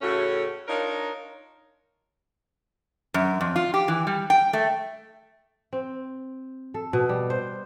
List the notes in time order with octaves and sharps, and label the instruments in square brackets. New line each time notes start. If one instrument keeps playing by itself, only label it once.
[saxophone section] A2 C#3 A3 C#4 F#4
D4 D#4 F4 A#4 C#5 D#5
[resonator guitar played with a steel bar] F#2
F2
F4
G4
E3
G3
G5
A3
[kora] C4
A4
B2
G3
C5